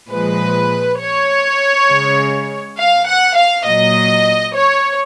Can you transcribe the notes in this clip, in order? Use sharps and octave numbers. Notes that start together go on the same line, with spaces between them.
A#2 F3 G#3 B4
C#5
C#3 G#3
F5
F#5
F5
A#2 F#3 D#5
C#5